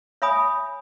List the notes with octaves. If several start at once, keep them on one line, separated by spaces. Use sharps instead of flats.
C#5 E5 G#5 B5 D#6